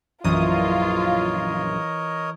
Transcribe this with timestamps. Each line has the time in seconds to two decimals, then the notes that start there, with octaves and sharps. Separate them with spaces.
0.24 A#1 F#2 E3 F4 A#4 C#5 D#5 D#6